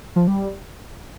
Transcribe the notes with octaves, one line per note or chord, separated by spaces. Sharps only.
F3
G3